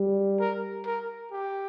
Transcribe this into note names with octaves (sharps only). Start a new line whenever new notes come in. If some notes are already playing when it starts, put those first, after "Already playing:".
Already playing: G3
A#4
A#4
G4